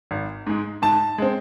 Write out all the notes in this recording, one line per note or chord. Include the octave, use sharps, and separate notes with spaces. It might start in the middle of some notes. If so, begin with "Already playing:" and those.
G#1
G#2 G#3
G#2 A5
G#3 C4